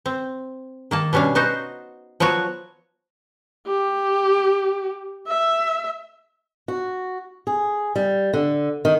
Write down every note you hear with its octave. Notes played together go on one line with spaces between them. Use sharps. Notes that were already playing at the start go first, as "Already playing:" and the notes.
C4
D#3 A#3 A5
B2 G3 C#4 D4 F5
B3 D#4 F#4 C5
F3 F#3 B3 F#4 C#5
G4
E5
F#4
G#4
G3
D3
D#3